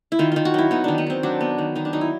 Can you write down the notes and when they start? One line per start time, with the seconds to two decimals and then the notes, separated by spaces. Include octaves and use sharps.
0.12 E4
0.19 D#3 F4
0.32 D#3 F4
0.45 F#4
0.54 F#3 E4
0.71 B3 D#4
0.84 D#3 D4
0.98 B3
1.07 D#3 C4
1.23 F#3 D4
1.41 B3
1.58 D#3
1.76 D#3 D#4
1.85 D4
1.93 F#3 D#4
2.01 E4